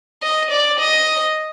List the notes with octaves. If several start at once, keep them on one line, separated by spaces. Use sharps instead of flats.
D#5
D5
D#5